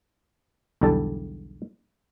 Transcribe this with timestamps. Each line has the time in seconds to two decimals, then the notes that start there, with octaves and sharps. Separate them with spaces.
0.81 B1 E2 D3 G3 A4 A5